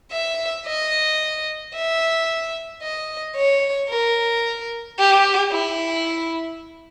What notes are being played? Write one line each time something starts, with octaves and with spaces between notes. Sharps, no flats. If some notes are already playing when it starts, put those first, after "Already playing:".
E5
D#5
E5
D#5
C#5
A#4
G4
E4